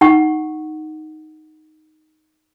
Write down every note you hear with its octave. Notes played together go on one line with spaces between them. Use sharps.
D#4 F#5 C#6